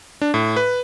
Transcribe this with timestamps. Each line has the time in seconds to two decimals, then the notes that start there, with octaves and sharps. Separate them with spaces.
0.22 D4
0.34 A2
0.56 B4